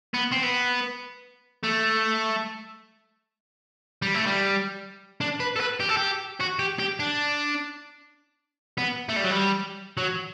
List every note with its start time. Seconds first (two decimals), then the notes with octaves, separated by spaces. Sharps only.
0.14 B3
0.32 C4
0.44 B3
1.64 A3
4.02 G3
4.15 A3
4.27 G3
5.21 D4
5.40 B4
5.56 A4
5.60 B4
5.80 G4
5.89 A4
5.97 G4
6.40 F#4
6.59 G4
6.79 G4
7.00 D4
8.78 B3
9.09 A3
9.16 G3
9.24 F#3
9.30 G3
9.98 F#3